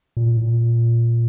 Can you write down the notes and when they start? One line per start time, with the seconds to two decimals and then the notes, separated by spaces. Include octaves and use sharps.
0.17 A#2
0.37 A2
0.43 A#2